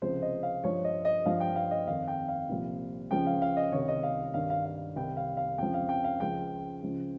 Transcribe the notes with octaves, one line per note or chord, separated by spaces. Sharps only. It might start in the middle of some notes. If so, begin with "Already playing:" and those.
C#2 C3 F3 C5
D#5
F5
G2 F3 C#5
D#5
D#5
G2 F3 F5
G5
F5
D#5
F2 D#3 F5
G5
F5
C2 A#2 F3
C#2 C#3 F3 G5
F5
F5
D#5
C2 C3 D#3 C#5
D#5
F5
G2 D#3 F5
F5
F5
C2 C3 D#3 G5
F5
F5
F2 C#3 F3 G5
F5
G5
F5
C#2 C#3 F3 G5
C#2 C#3 F3